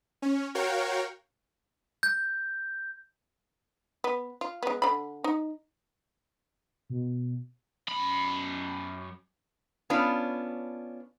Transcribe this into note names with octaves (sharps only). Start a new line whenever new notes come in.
C#4
F#4 A#4 C#5 F5 G5
G6
B3
F4
G#3 B3
D3 B5
D#4
B2
F#2 B5
B3 C#4 D4 F4